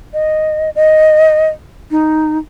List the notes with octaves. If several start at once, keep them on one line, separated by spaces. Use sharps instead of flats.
D#5
D#5
D#4